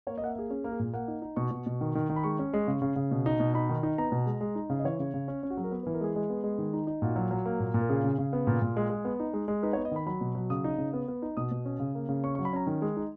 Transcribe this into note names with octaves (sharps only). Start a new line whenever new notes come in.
A#3 C#5
D#5
A#3 F#5
E5
A#3 G#4
C#4 G#4
A#3 A#4
G#4
A#2
A#3 F#5
D#4
D#4
B2 C#6
B2
B2
D#3
D#3
D#3
B5
G#3 C#6
C#4
G#3
C#3
C#3
C#3
B2
D#4
B2
D#4 B5
D#3
D#4
B3 A#5
B2
G#3
G#3
D#4
C#3
D#5
E3 C#5
C#3
C#3
C#4
C#4
F#4
F#3 G#4
A#4
B3 B4
B4
E3
A#4
G#3 G#4
G#3
B3
G#3
D#3
D#4
D#4
A#2 F#4
F#3
F#3
A#3
A#2
A#2
A#4
C#3 G#4
C#3
C#3
B3
A#2
A#2
G#3
G#3
B3
D#4
G#3
G#3
D#4 B4
C#5
B3
D#5
D#3 B5
F#3 B5
B2
F#3
C#3 D#6
D#4
C#3
B3
B3
D#4
B2 D#6
B2
C#4
C#3
A#3
C#3
C#4 C#6
C#6
F#3
B5
C#4 A#5
D#3
G#3
D#4